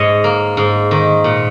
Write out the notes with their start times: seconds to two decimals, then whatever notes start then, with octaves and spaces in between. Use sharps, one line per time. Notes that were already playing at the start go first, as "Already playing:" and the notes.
Already playing: G#2 C#5 D#5
0.24 A#3
0.57 G#2
0.91 D#3
1.24 A#2